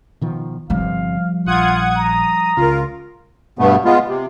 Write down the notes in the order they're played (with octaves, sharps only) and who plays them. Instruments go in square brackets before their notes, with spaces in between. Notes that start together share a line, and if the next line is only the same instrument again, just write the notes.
[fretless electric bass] B2 D#3 F3
[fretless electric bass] G1 C3 [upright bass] F3 G3 [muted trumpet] F5
[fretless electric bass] A#1 [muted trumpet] F4 [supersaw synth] F#5 D#6 G#6
[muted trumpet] A#5 [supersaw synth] D#6
[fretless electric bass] C#2 C#3 [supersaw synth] F4 A#4
[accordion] G2 B2 A3 B3
G#3 B3 F4
C3